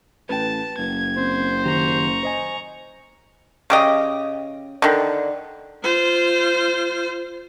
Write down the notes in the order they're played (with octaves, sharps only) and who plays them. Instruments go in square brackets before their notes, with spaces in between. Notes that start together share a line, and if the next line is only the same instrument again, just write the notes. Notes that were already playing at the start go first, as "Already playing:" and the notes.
[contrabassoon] A1 [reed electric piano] B4 G5 [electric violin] A5
[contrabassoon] F#1 [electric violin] G#6
[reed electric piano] C4 [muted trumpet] C5
[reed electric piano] D#3 G4 [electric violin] A#5 C#6
[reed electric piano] C5 D#5 G#5
[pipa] C#3 G4 D#5
D3 D#3
[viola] F4 C5